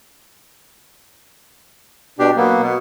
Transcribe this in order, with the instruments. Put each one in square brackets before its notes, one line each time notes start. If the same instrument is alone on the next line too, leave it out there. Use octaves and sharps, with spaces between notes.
[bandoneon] B2 G4 [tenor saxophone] D4
[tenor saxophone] F#3 [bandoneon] A#3 B3
[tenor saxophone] B2